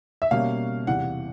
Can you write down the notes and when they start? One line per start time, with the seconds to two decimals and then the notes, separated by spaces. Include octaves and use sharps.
0.22 E5
0.31 B2 G3 A#3 C#4 F5
0.87 E2 C3 E3 F#5